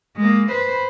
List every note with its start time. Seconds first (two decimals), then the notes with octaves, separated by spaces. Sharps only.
0.17 G#3 A#3
0.51 B4 C5